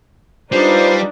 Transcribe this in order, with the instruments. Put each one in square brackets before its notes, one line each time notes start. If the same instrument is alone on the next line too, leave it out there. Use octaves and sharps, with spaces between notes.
[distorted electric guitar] G3 [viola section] D4 D#4 [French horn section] F4 B4 [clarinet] C5